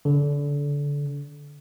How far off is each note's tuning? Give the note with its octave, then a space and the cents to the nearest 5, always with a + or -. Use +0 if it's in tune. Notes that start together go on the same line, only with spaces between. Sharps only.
D3 -30